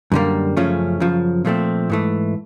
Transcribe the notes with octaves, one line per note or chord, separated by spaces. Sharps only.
F#2 D3 G3 A#3
F#2 C#3 F3 A3 C#4
F#2 C#3 F3
A#2 F3 A3 C4
G#2 E3 A3